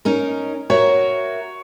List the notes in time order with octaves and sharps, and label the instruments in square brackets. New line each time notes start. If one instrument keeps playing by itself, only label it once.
[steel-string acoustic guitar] C#4 D#4 A#4
[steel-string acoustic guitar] F#4 A#4 E5 [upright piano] C#5